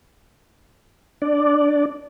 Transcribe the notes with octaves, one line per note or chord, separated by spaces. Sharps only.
D4 D5